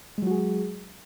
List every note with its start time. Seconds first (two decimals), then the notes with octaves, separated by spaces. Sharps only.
0.18 G#3
0.22 F#3
0.27 F#4
0.31 G#4